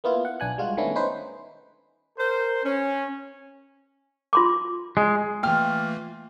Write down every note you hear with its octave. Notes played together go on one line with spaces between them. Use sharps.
A#3 B3 E4 F4
F#5
B1 D4 G#5 F#6
G3 G#3 F4 F#4
D#3 A3 B3 C#4 D4 E4
C#4 D#4 B4 C5
A#4 C5
C#4
F4 C6 D6
G#3
E3 A3 A#3 F4 G5 F6